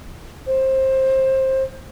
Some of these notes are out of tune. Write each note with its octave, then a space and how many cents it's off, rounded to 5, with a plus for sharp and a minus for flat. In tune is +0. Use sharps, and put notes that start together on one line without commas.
C5 +20